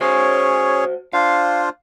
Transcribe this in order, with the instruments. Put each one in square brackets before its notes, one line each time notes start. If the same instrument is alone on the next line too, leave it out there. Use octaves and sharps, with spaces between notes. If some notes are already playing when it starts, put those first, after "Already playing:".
[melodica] C#4 G#4 C#5 [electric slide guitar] F#4 C5
[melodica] D4 F4 C5 [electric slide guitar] F5